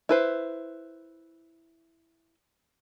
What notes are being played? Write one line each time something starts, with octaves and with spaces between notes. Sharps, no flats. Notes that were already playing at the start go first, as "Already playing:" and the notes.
E4 B4 C5